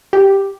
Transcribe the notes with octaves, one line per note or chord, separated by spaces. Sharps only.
G4